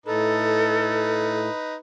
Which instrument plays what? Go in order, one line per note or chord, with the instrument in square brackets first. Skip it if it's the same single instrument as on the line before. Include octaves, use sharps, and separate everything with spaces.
[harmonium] A2 [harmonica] D#4 B4 [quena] A4